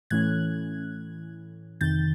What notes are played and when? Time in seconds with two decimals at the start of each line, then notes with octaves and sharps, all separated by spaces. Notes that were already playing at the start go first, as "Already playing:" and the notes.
0.10 A2 E3 A3 C#4 F#6 G#6
1.81 F2 C3 D#3 G6 A6